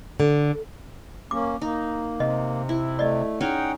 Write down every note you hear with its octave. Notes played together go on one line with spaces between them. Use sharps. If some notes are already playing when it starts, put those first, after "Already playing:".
D3
A#3 C#4 D6
A#3 D#4
C3 D#5
E4
A3 D5 D#5
C#4 D#4 G#4 F#5 G5